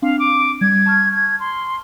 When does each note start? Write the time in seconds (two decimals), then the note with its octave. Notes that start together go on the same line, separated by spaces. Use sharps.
0.02 C4 D4 F5
0.19 D6
0.61 G3 G#6
0.86 A5 C#6 F6
1.13 G#6
1.40 C6